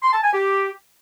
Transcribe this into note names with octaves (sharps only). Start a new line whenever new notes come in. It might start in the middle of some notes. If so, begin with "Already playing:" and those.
C6
A5
G#5
G4